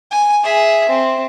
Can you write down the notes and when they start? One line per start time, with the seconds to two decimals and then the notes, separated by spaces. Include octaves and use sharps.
0.11 G#5
0.43 G#4 E5
0.89 C4